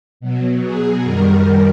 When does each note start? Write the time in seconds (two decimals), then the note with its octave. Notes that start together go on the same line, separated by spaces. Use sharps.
0.20 B2 F#3
0.63 G#4
1.03 F#2 D#3 G3 A#4